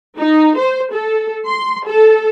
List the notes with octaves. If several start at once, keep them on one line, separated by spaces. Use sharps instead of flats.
D#4
C5
A4
C6
A4